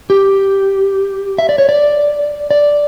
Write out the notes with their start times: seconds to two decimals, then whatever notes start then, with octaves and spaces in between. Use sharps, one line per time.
0.10 G4
1.38 E5
1.49 D5
1.58 C#5
1.69 D5
2.51 D5